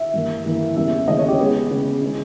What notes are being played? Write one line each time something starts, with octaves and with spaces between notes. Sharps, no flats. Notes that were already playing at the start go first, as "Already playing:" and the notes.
Already playing: E5
G2 E3 A#3
G2 E3 A#3
E2 C#3 G3 A#3 C#4 E5
E2 C#3 G3 A#3 C#4 D#5
C#5
G4
C#3 G#3 B3 G#4
C#3 G#3 B3
C#3 G#3 C#4